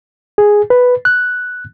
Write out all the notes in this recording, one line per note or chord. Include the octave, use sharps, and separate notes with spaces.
G#4
B4
F#6